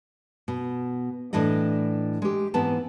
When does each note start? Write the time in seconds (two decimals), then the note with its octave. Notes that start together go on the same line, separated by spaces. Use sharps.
0.48 B2
1.33 A2 E3 D4 D5 D#5
2.22 G#3 G4
2.54 G#2 E3 B3 C4 A5